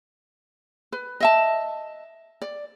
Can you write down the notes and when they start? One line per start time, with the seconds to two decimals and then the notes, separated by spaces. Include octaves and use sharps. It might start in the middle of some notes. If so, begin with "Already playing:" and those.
0.92 B4
1.20 D#5 E5 A5
2.42 D5